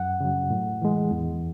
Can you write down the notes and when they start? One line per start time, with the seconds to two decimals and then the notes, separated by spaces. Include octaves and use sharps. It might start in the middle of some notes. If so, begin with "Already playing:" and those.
Already playing: F#2 F#5
0.20 C#3 F#3
0.50 A2
0.82 E3 G#3
1.11 E2